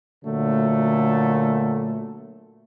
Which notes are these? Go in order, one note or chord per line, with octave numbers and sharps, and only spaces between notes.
A#2 D3 F#3 A3